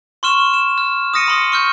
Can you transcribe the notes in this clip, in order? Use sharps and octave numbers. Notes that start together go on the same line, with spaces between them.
C6 C#6 F6 E7
E7
F6
D#6 F6 A#6 C#7 D#7
B5 C6 D#6
C#6 F6 G6